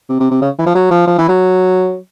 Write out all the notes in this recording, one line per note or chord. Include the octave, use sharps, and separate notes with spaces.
C3
C3
C3
C#3
E3
F3
F#3
F3
F3
E3
F#3